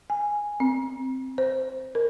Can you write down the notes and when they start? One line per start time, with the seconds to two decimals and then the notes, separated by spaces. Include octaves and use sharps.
0.10 G#5
0.60 C4
1.38 C5
1.95 A#4